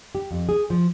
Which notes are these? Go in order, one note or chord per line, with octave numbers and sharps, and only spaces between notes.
G4
F2
G#4
F3